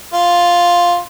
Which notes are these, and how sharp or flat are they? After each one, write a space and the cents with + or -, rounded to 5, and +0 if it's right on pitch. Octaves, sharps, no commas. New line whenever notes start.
F4 +5